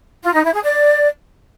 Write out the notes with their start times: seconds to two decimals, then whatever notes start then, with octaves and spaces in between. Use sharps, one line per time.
0.24 F4
0.34 D#4
0.44 E4
0.54 G#4
0.64 D5